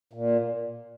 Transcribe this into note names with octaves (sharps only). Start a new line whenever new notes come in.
A#2